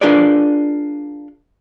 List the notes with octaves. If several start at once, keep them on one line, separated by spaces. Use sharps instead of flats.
D4 F4 G#4 A#4 B4 D5